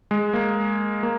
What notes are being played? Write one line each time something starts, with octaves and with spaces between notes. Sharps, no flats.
G#3
A#3
A#3